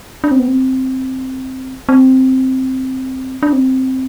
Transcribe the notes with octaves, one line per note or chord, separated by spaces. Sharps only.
D4
C4
B3
C4
C4
D4
C4